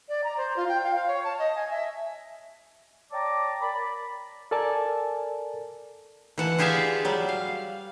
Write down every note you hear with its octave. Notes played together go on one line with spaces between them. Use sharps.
D5
A#5
C5
F4
G5
F5
F5
C#5
A5
D#5
G#5
E5
C#5 D5 G5 A5 A#5 D6
A#4 D5 B5
A4 A#4 D5 G#5 A5
E3 F#5 A5
F4 G4 G#4 D5 E5 F5
F#3 G3
F5